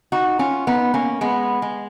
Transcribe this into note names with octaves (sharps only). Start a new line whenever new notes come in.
D#4 F#4
C#4 F4
B3 D#4
A#3 C#4
G#3 B3
G#3